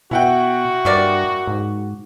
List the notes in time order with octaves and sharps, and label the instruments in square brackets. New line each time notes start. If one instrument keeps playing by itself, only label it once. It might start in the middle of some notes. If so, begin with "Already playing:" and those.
[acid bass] B2 [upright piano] E4 F#5 G5 [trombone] F#4
[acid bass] G2 [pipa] F#3 A#3 D5
[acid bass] G#2